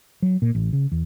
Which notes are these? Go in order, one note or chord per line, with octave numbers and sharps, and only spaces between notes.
F#3
A#2
A1
C#3
E2